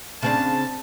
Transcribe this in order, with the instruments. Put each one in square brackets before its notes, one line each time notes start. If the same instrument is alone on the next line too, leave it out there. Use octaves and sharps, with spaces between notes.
[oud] C#3 C4 D4 [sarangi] A5